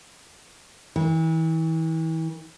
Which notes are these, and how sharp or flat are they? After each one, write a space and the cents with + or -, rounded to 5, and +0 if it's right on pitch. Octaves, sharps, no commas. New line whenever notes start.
E3 -35